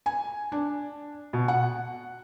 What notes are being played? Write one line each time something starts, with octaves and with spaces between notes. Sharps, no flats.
G#5
D4
B2
F#5